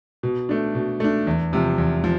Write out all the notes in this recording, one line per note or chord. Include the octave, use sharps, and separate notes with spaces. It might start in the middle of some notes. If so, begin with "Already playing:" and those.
B2
A3 D4
B2
A3 D4
E2
C3 F3
E2
F3